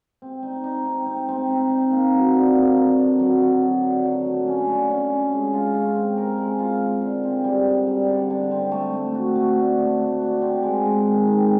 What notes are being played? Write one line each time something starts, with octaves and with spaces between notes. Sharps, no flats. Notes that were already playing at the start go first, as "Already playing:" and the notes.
C4
D#4
D#4
C4
C4
C4
C4
D#4
A#3
F#3
D3
A#3
D3
D3
F#3
F#3
F#3
D3
F#3
A3
C#4
D3
C#4
C#4
G#3
F4
F4
C4
A#4
G#3
F4
A#4
D3
C4
G3
D3
G3
D3
D3
C4
A3
A3
F#4
A3
D4
A3
F#4
D4
C4
G#3
G#3
D#3
C4